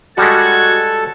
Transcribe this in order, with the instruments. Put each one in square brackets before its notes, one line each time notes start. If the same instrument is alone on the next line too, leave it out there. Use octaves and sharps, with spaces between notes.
[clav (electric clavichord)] G3 G#3 [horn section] F#4 [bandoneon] A4 A5 [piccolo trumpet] G#6